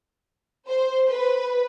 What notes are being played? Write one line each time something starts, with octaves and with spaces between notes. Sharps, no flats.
C5
B4